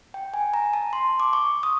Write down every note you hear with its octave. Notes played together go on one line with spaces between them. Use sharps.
G5
G#5
A#5
A5
C6
D6
C#6
D#6